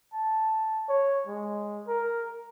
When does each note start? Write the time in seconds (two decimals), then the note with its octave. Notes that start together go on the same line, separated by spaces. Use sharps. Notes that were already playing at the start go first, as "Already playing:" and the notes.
0.13 A5
0.89 C#5
1.27 G#3
1.88 A#4